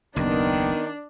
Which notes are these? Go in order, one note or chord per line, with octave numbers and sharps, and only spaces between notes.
F#1 D#2 D#3 B3 D4